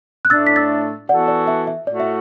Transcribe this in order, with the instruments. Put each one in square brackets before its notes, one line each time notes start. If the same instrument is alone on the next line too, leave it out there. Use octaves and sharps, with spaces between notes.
[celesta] F#6
[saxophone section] A2 A3 D4 [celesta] E6 A6
[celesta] B6
E6 A6
[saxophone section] E3 B3 F#4 A4 [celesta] D5 F#5
[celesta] D5
E5
E5
[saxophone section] A2 A3 F#4 [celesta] D5
[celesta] E5